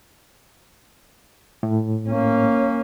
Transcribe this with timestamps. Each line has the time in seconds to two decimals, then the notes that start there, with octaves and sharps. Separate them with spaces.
1.63 A2
2.08 A#3 C#4